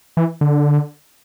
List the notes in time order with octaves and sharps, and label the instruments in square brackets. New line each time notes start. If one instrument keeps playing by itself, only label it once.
[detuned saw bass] E3
D3